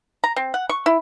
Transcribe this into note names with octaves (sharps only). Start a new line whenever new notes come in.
A#5
C4
F#5
C#6
E4